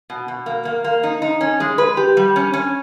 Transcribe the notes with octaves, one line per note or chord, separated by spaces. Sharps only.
B2
B2
A#3
A#3
A#3
D#4
D#4
C#4
G#3
B4
G4
G3
C#4
C#4